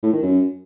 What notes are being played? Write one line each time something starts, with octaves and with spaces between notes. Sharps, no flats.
A2
D#3
F#2